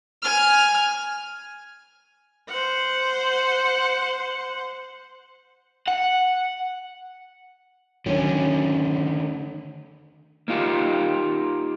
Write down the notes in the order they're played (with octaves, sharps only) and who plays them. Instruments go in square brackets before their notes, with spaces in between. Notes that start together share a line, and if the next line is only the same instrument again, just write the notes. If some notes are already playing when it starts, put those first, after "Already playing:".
[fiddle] G#5 F6
[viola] C5 F#5
[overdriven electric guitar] F#5
[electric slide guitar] D3 D#3 A3 [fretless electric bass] F#3 C4 C#4
[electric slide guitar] A#3 D#4 F4 G4